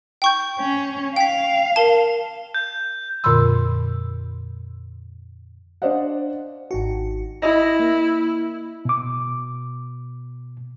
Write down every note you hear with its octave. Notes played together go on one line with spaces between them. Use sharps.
G5 C#6 G6
C#4
F5 G5 B6
A#4 A5
G6
F2 A#2 D3 B5 C6 E6
D4 C5 D5 D#5 F5 F#5
G#1 D#4 F#4
E4 D#5 A#6
A#3
B2 D6